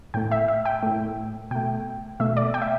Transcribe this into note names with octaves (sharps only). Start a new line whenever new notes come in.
A2 A3 G5
E5
E5
G5
A2 A3
B2 A3 G5
B2 A3 E5
D5
G5
E5